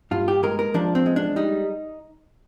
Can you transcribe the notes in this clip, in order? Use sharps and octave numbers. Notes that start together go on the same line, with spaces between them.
G2 F4
G4
G#3 A#4
A#4
F3 D4
C4
G#3
D4
G3 D#4